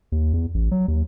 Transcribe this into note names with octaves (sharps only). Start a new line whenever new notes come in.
D#2
E2
A1
F#3
D#2